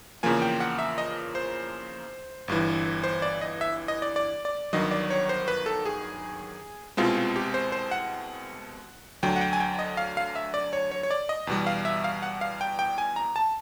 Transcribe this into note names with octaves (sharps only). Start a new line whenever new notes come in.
E2 C#3 F3 A#3 G#5
G5
F#5
E5
D#5
C5
G1 G2 E3
C5
D5
D#5
E5
D#5
D5
D5
D5
G1 G2 D#3 F#3 D#5
D5
C#5
C5
B4
A4
G#4
C2 B2 G#3 C4 F4
F4
G4
C5
C5
F#5
D2 D3 F#3 G5
F#5
G5
G#5
G5
D#5
F5
F5
E5
D5
C#5
C#5
C#5
D5
D#5
E2 B2 G3
F5
E5
F5
F#5
F5
G5
G5
G#5
A#5
A5